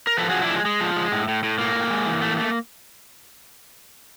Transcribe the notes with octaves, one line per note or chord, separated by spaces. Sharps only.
A#4
F3 A4 B4
F3 F#4 G#4
D4 E4
G#3
G#3
F3
G#3
A2
A2
A2
A2 A#3
A2
G#3
E3
A3
A3